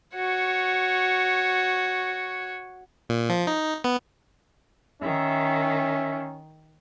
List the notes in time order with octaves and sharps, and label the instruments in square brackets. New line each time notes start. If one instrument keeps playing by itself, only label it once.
[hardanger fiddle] F#4 C#5
[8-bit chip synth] A#2
F3
D#4
B3
[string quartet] D#3 [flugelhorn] C#4 [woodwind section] E5